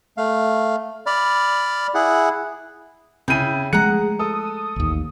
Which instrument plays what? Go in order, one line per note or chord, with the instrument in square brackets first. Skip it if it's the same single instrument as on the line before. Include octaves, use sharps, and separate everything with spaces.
[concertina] A3 F5
D5 B5 F6
E4 G#4 F#5
[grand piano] C#3 E4 D#7 [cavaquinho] G5 G#5
[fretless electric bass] F3 G#3 A3 [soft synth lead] G#4 [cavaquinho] F#5 A#5 [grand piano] C#7
[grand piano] A4 [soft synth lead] D#6
[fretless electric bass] A1 D#2